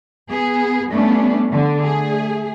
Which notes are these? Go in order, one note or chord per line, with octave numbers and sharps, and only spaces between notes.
B3 G#4
G3 A3 B3 C#4 D4
D3
A3 G#4